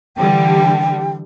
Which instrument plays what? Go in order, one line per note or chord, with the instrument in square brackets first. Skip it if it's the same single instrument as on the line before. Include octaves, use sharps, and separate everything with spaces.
[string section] D3 E3 G3 [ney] G5